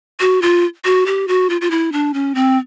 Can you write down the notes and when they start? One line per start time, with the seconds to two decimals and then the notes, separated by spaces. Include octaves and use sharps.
0.20 F#4
0.42 F4
0.85 F#4
1.06 G4
1.28 F#4
1.50 F4
1.61 F4
1.71 E4
1.92 D4
2.14 C#4
2.35 C4